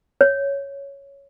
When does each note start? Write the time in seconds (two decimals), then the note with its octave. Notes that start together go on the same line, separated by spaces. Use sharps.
0.21 C#5